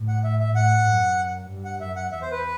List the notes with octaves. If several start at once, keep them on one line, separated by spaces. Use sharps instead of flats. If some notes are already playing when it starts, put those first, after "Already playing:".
Already playing: A2
F#5
E5
E5
A2 F#5
F#2
G2
F#5
F#2 E5
F#5
E2 E5
C5
B4